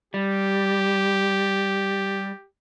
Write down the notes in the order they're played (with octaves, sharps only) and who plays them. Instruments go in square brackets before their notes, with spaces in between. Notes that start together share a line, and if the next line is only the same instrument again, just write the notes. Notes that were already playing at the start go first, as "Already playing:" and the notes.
[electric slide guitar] G3 [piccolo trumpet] G4